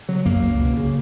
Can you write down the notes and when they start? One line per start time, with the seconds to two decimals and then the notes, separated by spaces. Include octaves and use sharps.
0.09 C#3 F#3
0.26 F#2 A#3
0.43 C#2
0.61 B2
0.77 C#3